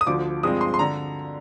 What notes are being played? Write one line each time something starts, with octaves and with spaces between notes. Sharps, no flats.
D#6
D2 D3 F3 D6
G2 F3 G#3 C4 D#6
C6
C6
D3 A#5